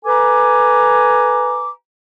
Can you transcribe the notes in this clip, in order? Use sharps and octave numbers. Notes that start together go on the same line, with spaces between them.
A4 B4 G#5 A#5 D6